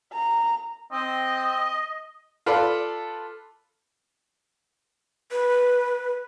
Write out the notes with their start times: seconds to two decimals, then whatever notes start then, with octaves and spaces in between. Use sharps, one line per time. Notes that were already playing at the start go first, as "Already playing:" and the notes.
0.13 A#5
0.92 C4 D#5
2.46 F4 A4 B4 D5
5.32 B4